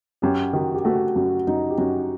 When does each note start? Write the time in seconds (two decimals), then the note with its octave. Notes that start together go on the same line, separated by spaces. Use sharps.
0.22 F#2 G4
0.53 D#3 F#4
0.74 G4
0.85 A3 F#4
1.16 F#2 F#4
1.47 F#2 D#4
1.70 G4
1.78 F#2 F#4